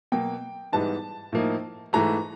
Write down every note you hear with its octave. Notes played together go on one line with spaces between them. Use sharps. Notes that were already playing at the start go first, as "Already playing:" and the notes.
B2 F#3 A#3 G5
G#2 E3 G3 B3 D#4 A5
A2 F3 A#3 D#4
G#2 E3 A3 A#5